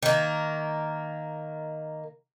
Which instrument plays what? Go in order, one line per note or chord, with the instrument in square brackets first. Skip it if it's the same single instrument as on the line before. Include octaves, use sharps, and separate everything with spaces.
[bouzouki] D#3 A#3